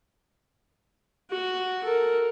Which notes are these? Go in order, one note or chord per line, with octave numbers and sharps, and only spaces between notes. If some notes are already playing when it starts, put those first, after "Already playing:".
F#4
A4 A#4